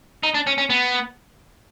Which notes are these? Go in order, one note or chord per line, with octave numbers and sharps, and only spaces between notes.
D#4
D4
C#4
C#4
B3